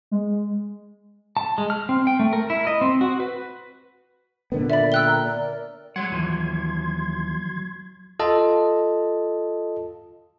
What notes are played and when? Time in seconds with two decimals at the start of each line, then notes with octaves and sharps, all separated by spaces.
0.11 G#3
1.37 A5
1.58 G#3
1.70 F6
1.89 C4
2.07 G5
2.20 A3
2.33 A#4
2.50 E4
2.67 D#5
2.81 C4
3.01 F#4
3.20 B4
4.52 A#2 D3 B3 A#4
4.70 D5 E5 B5
4.92 G5 E6 F#6 G7
5.07 A#4 A#5
5.24 D5
5.96 F#3 G#3 C#5 F#5 C6 G#6
6.10 D#2 E3 F3
8.20 F4 A4 D#5 A5